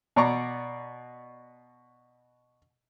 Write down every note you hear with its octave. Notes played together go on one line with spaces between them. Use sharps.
B2 D5 A#5 C#6